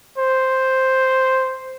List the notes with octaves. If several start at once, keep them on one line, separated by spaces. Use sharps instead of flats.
C5